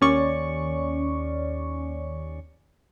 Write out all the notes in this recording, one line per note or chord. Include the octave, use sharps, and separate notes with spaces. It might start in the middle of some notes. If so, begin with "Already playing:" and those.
D#2 C#4 D5 C#6